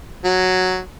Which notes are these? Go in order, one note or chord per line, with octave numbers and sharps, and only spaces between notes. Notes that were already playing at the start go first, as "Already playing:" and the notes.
F#3